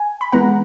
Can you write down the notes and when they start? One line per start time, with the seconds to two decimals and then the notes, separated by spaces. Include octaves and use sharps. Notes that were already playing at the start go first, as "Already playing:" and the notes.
Already playing: G#5
0.21 B5
0.32 E3 G#3 B3 F#5 A#5